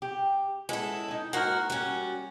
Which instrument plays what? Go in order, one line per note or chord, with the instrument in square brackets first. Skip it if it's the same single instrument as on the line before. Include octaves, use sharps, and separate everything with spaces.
[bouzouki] G4
[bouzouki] G#3 B3 [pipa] C#4 [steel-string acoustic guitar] E4 A4
[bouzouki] D#4 G#5
[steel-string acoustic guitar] G#2 F#4 [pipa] A#3 A#4 [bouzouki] F#5
[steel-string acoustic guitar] G3 C#4 [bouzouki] F#4